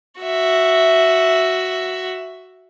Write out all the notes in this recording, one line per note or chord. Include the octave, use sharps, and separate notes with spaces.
F#4 E5